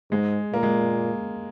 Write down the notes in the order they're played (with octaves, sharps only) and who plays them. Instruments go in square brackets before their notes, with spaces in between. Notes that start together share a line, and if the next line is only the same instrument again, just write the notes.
[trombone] G#2 [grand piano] G#3
[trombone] A#2 [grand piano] A#3
[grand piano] G#3